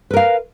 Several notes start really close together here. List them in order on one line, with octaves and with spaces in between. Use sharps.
B4 A#4 F5